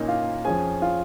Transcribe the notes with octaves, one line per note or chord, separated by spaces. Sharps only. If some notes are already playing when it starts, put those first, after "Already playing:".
Already playing: A#2 A#3 C#4 D#4 D#5
F4 F5
F2 F3 C#4 G#4 G#5
F4 F5